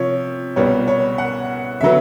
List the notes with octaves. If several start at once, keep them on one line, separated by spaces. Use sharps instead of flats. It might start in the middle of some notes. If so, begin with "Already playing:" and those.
Already playing: C3 F3 C#5
C2 B2 G3 B3 C#5
C#5
F#5
D3 F#3 B3 E5